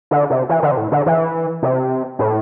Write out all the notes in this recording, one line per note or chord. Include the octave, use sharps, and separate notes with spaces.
D3
C3
E3
D3
C3
A2
D3
E3
C3
A2